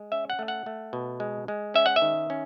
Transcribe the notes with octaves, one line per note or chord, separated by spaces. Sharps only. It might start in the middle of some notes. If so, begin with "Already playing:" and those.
Already playing: G#3
C#4 E5
F#5
A3
F#5
A3
B2
G#3
G#3
C#4 E5
F#5
E5
D#3
C#4